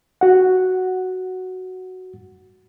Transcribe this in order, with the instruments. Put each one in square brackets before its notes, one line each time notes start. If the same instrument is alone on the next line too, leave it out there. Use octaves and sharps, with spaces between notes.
[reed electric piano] F#4 F#5